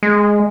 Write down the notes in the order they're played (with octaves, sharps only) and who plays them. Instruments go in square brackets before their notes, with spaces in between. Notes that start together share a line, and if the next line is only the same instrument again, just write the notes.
[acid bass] G#3